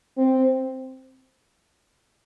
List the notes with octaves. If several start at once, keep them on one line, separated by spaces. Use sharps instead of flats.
C4